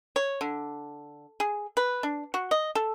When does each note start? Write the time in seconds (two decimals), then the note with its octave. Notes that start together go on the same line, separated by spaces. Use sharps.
0.16 C#5
0.41 D3
1.40 G#4
1.77 B4
2.03 D4
2.34 F#4
2.51 D#5
2.75 A4